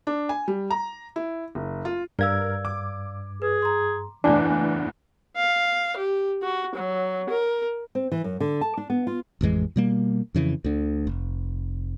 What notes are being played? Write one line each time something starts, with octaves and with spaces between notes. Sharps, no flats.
D4
G#5
G3
A#5
E4
F#1
F4
G2 A#4 D5 F5 E6 G#6
D6
G#4 B4
A#5 C6
F#1 E2 A2 E3 D4 D5 G#5
F5
G4
F#4
F#3
A#4
C4
E3
F#2
D3
A5
D4
B3
F4
A1 F2 E3 G#3
B2 G3 A#3
F2 C#3 E3
D2 D3
F1